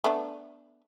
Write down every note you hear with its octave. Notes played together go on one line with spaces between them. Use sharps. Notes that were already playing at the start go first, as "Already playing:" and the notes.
A3 B3 D4